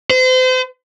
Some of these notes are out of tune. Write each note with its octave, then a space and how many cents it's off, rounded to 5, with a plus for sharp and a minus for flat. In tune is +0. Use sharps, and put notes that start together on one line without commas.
C5 -35